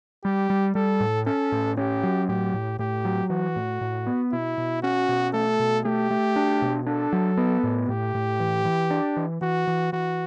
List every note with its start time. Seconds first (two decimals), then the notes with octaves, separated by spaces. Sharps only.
0.24 G3 G4
0.50 G3
0.75 G3 A4
1.00 A2
1.26 C#4 A4
1.52 A2
1.77 C#4 G4
2.03 F#3
2.29 A2 G4
2.54 A2
2.79 A2 G4
3.05 F#3
3.30 E3 F#4
3.56 A2
3.81 A2
4.07 B3
4.32 B2 E4
4.58 B2
4.82 C#4 F#4
5.09 B2
5.33 A3 A4
5.60 B2
5.85 A3 G4
6.11 A3
6.36 D4
6.62 B2
6.87 D4 A4
7.13 F#3
7.37 B3
7.64 A2
7.89 A2 G4
8.15 A2
8.40 E3
8.65 E3
8.90 D4
9.17 E3
9.41 E3 F#4
9.67 E3
9.92 E3 F#4